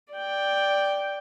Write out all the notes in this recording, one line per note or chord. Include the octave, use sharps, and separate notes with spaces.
D5 G5